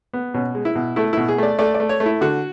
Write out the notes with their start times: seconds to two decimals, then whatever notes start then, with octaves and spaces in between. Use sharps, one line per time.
0.13 B3
0.34 B2 C#4
0.55 G#3
0.65 E4
0.75 B2
0.96 A3 E4
1.13 B2 E4
1.28 G#4
1.38 A3 D5
1.59 A3 D5
1.74 D5
1.80 A3
1.89 C#5
2.00 A3
2.06 E4
2.21 D3 F#4